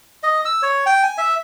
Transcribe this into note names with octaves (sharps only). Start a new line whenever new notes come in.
D#5
E6
C#5
G5
G#5
E5